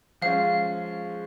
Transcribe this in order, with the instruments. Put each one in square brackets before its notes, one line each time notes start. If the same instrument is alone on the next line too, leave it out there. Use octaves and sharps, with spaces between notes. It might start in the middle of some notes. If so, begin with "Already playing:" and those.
[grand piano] F3 G#3 C#4 [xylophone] F5